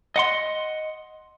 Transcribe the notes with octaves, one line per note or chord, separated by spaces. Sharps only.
D#5 F#5 C6